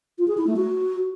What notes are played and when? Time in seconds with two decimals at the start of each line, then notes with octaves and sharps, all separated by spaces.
0.18 F4
0.28 G#4
0.37 E4
0.47 A3
0.57 F#4